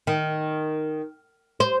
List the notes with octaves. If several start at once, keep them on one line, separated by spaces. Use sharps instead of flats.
D#3
C5